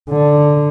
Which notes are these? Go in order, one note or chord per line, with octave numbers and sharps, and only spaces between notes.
D3